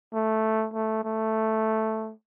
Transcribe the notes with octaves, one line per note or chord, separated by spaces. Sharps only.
A3
A3
A3